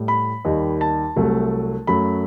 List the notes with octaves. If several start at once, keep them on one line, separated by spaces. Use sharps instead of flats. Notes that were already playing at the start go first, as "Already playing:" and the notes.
Already playing: A2 G3
B5
D#2 D#3 G3
A5
C2 C3 F#3 A3
F#2 F#3 A3 B5